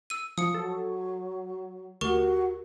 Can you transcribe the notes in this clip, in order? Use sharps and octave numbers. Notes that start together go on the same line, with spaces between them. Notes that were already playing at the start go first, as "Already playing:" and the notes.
E6 D#7
F3 D#6 C#7
F#3 A4
D2 F#4 G4 A#4 C#6